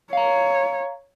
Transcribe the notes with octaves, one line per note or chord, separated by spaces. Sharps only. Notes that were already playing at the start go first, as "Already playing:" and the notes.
C#5 F5 A#5